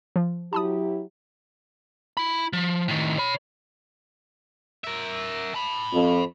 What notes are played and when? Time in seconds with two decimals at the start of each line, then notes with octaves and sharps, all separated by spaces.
0.16 F3
0.53 F#3 E4 G4 A5 B5 D#6
2.17 E4 B5
2.53 F3
2.88 A2 D#3
3.18 C#5 B5
4.84 A#4 E5
5.54 A5 B5
5.92 F2